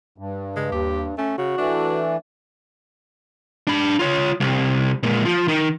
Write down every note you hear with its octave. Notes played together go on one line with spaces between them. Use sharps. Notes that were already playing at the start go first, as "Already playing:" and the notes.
G2
C#3 G#3
D#2 G4
A3 C#4
C#3 F#4
E3 A3 D4
D4 B5
F4 C#5
C2
A#2 G#3
F3
D#3